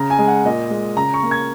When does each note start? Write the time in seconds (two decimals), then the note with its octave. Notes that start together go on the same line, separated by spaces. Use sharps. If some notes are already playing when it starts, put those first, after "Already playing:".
Already playing: C#3 A#5
0.10 G#5
0.18 G#3
0.28 F#5
0.44 A#2 D#5
0.70 G#3
0.97 C#3 A#5
1.14 C#6
1.23 A#3
1.31 G#6